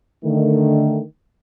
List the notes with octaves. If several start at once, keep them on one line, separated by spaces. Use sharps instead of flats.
D3 D#3 A3